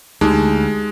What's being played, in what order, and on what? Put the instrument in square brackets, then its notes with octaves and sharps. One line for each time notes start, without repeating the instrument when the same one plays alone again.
[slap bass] D2 [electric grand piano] G#3 [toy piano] D#4 G4 D6